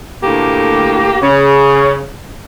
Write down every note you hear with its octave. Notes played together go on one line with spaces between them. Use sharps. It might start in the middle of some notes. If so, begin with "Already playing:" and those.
D2 A2 A#3 G4
C#3 C#4